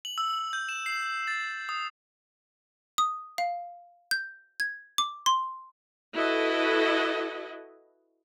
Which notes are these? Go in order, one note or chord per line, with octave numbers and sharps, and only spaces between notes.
F#7
E6
G6
E7
C7
A6
D#6
D#6
F5
G6
G#6
D6
C6
E4 F#4 A4 B4 D#5